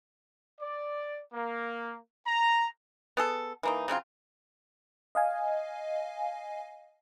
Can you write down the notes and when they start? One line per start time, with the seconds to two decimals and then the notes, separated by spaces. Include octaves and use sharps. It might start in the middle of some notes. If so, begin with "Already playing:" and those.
0.59 D5
1.33 A#3
2.25 A#5
3.17 B3 G#4 A4
3.63 E3 A#3 D#4
3.88 C#3 F#3 C4 F4
5.15 D#5 F5 G#5